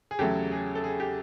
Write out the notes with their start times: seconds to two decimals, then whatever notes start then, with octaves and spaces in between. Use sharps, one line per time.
0.11 G#4
0.19 E2 C#3 F#3 A3 G4 A4
0.52 G#4
0.75 A4
0.84 G#4
1.00 G4